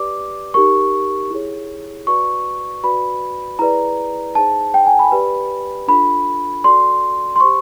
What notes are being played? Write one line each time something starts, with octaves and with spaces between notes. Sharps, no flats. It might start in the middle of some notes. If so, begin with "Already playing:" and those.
Already playing: G4 B4 D5 D6
D#4 G4 A#4 C#6
E4 G#4 C#5
F#4 B4 D5 C#6
F#4 B4 D5 B5
E4 G#4 B4 D5 A#5
D#4 G#4 C5 A5
G5
G#5
B5
G4 B4 D5
D4 F4 A4 B5
F#4 A4 D5 C6
C6
G4 C5 C#6